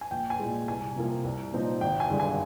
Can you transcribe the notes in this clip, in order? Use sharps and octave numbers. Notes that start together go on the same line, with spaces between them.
G#5
A#1 G5
G#5
A#2 G#3
C2 G#5
C3 F3 A#3
C2
A#2 F3 C4 D#4
G#1 G5
G#5
G2 D3 G#3
G#5